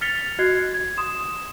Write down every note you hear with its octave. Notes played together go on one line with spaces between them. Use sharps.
F6 A6 B6 C#7 F7 G7
F#4 D#5 F#6 G#6 C7
G#6
C6 D#6 E7